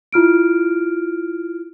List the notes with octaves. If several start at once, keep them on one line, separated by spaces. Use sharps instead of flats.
E4 F4 F6 D7